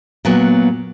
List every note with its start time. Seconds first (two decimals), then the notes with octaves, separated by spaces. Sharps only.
0.25 A#2 F#3 B3